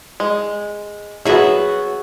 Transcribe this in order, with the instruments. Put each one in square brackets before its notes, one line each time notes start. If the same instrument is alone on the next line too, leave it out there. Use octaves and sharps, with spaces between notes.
[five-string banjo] G#3
[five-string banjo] F#3 B3 [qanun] F#4 G#4 E5